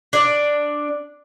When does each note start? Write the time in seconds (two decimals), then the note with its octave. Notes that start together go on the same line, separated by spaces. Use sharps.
0.13 D4 D5